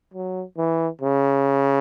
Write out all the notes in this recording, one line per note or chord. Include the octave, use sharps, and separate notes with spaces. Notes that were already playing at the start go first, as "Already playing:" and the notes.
F#3
E3
C#3